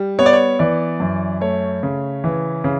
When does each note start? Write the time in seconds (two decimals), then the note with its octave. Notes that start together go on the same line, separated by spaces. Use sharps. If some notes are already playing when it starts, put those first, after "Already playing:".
Already playing: G3
0.19 B3 C#5
0.26 D5
0.33 C#5
0.59 E3 D5
1.00 F#2
1.41 A3 C#5
1.83 C#3
2.24 E3
2.64 C#3